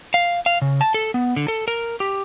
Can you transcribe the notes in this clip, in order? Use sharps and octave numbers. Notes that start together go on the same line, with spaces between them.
F5
F5
C#3
A5
A4
B3
D3
A4
A#4
G4